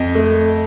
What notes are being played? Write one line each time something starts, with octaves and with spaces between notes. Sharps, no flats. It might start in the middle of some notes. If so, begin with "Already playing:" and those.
Already playing: F2 D#5
A3